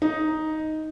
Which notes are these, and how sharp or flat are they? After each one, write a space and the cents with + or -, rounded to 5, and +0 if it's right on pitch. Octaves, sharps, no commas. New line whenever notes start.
D#4 +5